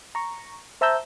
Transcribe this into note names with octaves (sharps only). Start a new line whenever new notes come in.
A#5 C#6
C5 E5 A5 A#5 E6 G6